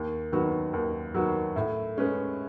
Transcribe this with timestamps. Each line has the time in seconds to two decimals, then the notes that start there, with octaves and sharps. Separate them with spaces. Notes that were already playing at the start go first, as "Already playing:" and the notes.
Already playing: D#2
0.32 D#3 F#3 B3 F#4
0.73 D#2
1.14 D#3 F#3 B3 F#4
1.56 A2
1.97 G#3 C#4 G#4 B4